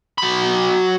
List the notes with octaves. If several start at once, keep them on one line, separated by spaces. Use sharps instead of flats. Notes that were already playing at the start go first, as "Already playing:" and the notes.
F#3 B5